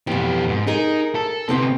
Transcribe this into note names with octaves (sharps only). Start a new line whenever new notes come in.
F2 B2 E3 G4
G#2
D#4 G#4 A#4
A4
D2 C3 B3 C4 G5